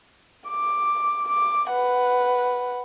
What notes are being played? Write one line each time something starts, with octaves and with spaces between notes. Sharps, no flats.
D6
D6
B4 F#5